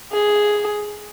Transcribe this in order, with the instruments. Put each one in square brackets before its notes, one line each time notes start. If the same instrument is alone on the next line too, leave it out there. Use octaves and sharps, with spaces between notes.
[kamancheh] G#4